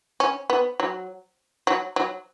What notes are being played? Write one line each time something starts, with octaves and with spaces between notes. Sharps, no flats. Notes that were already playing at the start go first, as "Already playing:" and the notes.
C#4
B3
F#3
F#3
F#3